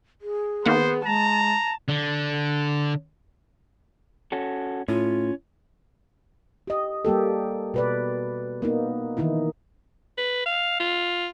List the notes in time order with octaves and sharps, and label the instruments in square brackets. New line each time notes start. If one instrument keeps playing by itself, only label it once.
[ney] G#4
[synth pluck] D#3 A#3 F#5 [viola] B3 [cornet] C5
[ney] G#3 [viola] A5 [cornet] A#5
[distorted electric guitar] D3
[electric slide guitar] C#4 F#4 A4
[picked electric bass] A2 [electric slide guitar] C#4 [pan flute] F4
[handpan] G4 D#5
G3 A#3 G4 A4
B2 B4 D5
A#3 B3 D#4
D#3 E3 D#4 E4
[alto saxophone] B4
F5
F4